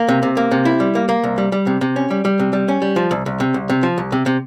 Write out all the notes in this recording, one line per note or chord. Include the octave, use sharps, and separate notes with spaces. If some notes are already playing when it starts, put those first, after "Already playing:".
Already playing: A#3
C3
C3
A#3
C3
E4
G3
A#3
A#3
C2
G3
G3
C3
C3
C#4
G3
G3
C3
G3
C#4
G3
F3
C2
C2
C3
C2
C3
F3
C2
C3
C3